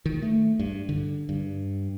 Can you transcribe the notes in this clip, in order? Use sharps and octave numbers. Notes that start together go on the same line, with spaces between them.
D#3
A3
G2
D3
G2